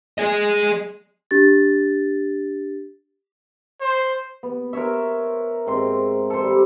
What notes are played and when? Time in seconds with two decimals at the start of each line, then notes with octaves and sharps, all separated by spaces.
0.18 G#4 D#5
1.31 D4 G4 A6
3.81 C5
4.43 B3
4.73 A#4 C5 C#5 E5
5.67 G#2 C4 C6
6.30 A4 C5
6.44 G3